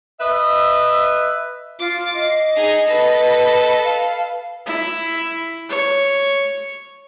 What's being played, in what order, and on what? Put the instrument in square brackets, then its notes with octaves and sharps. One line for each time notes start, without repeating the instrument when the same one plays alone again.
[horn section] B4 D#5 E5
[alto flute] F4 [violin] D6 C7
[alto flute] D#5
[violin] D#4 G#4
A4 B4
[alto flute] F5
[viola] E4
C#5